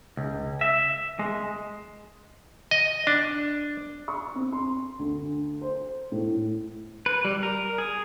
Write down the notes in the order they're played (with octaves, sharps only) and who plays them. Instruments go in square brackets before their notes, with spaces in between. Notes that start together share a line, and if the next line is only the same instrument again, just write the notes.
[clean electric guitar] C#2
E5
G#3
[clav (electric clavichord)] D#5
D4
[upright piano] C#6
C4
C6
D2
C5
A2
[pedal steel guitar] B4
G3
A#4
G#4